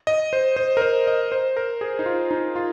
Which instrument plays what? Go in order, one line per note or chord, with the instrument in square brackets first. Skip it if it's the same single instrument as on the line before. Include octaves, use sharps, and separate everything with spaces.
[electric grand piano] D#5
C5
C5
A#4
C5
D#5
C5
A#4
G#4
D#4
F4
D#4
F4